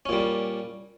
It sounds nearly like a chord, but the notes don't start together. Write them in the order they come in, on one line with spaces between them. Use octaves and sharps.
C#4 A#2 G3